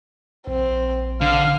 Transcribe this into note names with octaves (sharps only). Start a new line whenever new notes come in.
A#1 C4
D3 F5 F6